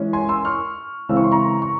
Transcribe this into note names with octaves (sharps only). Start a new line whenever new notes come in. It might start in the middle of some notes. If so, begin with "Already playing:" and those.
Already playing: E3 G#3 C#4
G#5 C6
C6 E6
C#6 F6
C#3 E3 G#3 C4 E6
C#6
C6
A#5 C#6
C#6